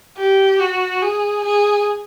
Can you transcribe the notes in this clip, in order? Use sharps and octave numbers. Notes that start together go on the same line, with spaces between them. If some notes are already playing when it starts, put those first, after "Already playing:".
G4
F#4
G#4
G#4